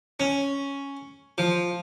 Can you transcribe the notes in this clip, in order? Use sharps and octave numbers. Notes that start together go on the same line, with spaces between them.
C#4
F3